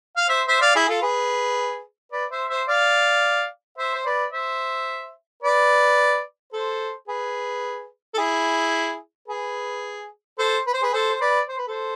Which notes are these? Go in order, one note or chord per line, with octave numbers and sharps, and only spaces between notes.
F5
C5 E5
C5 E5
D5 F5
E4 G#4
F4 A4
G#4 B4
B4 D5
C5 E5
C5 E5
D5 F5
C5 E5
C5
B4 D5
C5 E5
B4 D5
A4 C5
G#4 B4
A4
E4 G#4
G#4 B4
A4 C5
B4
C5
G#4 B4
A4 C5
C5
B4 D5
C5
B4
A4 C5